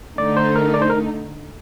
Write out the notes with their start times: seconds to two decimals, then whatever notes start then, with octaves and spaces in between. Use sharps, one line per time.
0.18 D3 A3 D#4 D5
0.37 C5
0.56 A#4
0.74 D5
0.82 C5
0.90 A#4